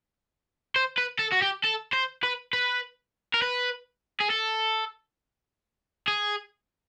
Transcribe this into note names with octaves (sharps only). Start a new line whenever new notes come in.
C5
B4
A4
F#4
G4
A4
C5
B4
B4
A#4
B4
G#4
A4
G#4